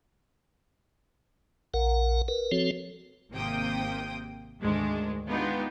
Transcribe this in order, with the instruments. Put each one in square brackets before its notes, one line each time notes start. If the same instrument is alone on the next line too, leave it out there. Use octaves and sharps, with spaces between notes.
[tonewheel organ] A#1 A#4 F#5
A#4 B4
F3 C4 F#4 A4 C#5
[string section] G#1 C3 A#3 G5 D#6
D2 G#2 D#3 G#3 D4
G#3 B3 D4 D#4 F4 G4